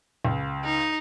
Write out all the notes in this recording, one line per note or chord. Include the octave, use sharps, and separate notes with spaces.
C#2
D#4